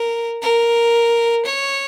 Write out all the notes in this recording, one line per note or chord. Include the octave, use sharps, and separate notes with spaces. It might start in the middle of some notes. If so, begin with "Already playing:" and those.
Already playing: A#4
A#4
C#5